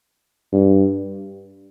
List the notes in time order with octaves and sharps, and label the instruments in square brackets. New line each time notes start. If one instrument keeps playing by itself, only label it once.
[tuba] G2